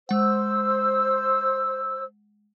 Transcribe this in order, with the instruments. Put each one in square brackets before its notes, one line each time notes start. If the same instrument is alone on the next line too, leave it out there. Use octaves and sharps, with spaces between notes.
[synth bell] G#3 F#5 [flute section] C5 E6